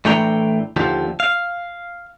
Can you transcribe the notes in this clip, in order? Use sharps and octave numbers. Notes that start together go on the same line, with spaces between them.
A2 E3 A3 D4 G5 A#5
D#2 D3 F3 G4
F5